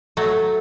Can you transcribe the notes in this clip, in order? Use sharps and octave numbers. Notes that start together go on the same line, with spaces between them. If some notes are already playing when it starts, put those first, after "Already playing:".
F#3 A3